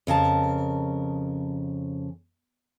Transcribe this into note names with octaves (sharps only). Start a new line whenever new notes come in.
F2 C#3 A#4 A5